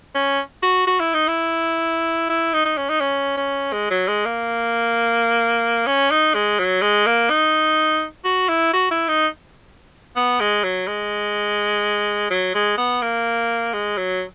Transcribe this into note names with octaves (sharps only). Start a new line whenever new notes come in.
C#4
F#4
F#4
E4
D#4
E4
E4
D#4
D#4
C#4
D#4
C#4
C#4
G#3
F#3
G#3
A#3
C#4
D#4
G#3
F#3
G#3
A#3
D#4
F#4
E4
F#4
E4
D#4
B3
G#3
F#3
G#3
F#3
G#3
B3
A#3
G#3
F#3